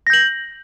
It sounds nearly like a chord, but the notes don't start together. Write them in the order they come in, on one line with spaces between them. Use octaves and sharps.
A#6 G6 F#7